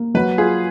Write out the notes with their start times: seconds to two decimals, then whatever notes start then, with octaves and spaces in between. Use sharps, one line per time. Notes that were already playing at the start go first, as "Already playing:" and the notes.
Already playing: A#3
0.14 F#3 B4
0.38 F4 G#4